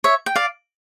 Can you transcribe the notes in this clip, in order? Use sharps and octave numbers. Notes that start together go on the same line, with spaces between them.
C#5 E5
G5
D5 F5